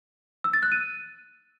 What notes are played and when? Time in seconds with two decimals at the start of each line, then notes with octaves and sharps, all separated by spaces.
0.44 E6
0.53 A6
0.63 F#6
0.72 D#7